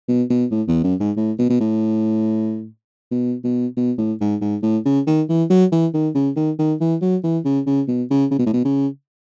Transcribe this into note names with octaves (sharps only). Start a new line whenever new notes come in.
B2
B2
A2
E2
F#2
G#2
A2
B2
B2
A2
B2
B2
B2
A2
G#2
G#2
A2
C#3
D#3
E3
F#3
E3
D#3
C#3
D#3
D#3
E3
F#3
E3
C#3
C#3
B2
C#3
C#3
B2
A2
B2
C#3